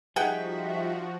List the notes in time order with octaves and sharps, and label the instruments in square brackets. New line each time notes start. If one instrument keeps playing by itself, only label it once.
[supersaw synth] F3 F#4 [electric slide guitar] G3 D#4 [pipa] G#4 F#5 G5 [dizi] E5